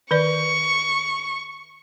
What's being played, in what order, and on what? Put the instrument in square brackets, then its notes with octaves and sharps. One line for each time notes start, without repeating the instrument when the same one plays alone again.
[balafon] D#3 B4 D5 [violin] C#6